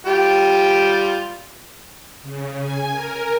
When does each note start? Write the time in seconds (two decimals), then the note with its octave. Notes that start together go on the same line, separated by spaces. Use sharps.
0.07 G3 F4 G4
2.22 C#3
2.59 G#5
2.91 A#4